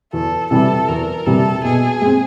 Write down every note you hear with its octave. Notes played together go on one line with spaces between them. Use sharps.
E2 A4
C3 E3 G3 A4
E2 A#4
C3 E3 G3 A4
B2 G#4
G#3 C4